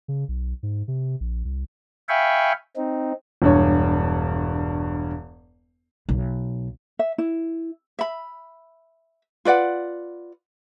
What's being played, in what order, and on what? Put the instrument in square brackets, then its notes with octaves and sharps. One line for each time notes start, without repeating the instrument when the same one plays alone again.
[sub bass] C#3
B1
G#2
C3
A#1
C2
[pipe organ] E5 F5 G5 G#5 B5 C#6
C4 D#4
[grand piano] E1 G2 C#5
[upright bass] B1
[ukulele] E5
E4
E5 B5
F4 B4 D5 F#5